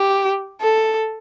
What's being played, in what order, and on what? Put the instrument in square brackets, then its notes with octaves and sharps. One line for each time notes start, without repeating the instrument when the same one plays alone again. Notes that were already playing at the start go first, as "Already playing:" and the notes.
Already playing: [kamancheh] G4
A4